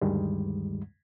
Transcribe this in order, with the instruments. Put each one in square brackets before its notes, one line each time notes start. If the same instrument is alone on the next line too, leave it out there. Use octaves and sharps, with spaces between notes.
[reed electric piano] D2 G2 D#3 G3 G#3